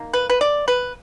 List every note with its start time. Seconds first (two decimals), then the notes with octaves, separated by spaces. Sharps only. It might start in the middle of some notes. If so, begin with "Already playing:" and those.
Already playing: D#3 A#3
0.13 B4
0.30 B4
0.41 D5
0.68 B4